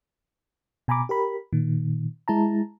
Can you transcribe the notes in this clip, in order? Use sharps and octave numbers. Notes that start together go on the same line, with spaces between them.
B2 G#5 A#5 B5 D6
G4 A#4 B5
A#2 D#3
G#3 E4 A5 A#5